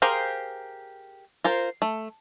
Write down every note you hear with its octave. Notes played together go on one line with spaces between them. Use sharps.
G4 G#4 A#4 C5 F5
F4 A#4 C5
A3